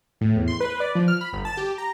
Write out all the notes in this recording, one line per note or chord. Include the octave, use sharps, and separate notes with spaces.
A2
E2
C6
B4
D5
F3
F6
B5
G1
A5
G4
A#5